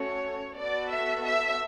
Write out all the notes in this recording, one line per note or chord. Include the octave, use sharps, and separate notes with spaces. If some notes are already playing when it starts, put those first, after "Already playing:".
Already playing: A3 C#4 F#4 A4 C#5
B3 F#4 A4 D5
E5
E5